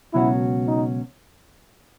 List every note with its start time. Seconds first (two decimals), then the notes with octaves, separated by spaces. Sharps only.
0.13 C#2 B2 F#3 C#4 E4 F#4
0.68 D#4